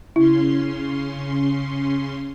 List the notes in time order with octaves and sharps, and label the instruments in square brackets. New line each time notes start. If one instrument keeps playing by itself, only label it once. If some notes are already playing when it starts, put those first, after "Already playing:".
[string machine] C#3 C#4 C6 [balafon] E4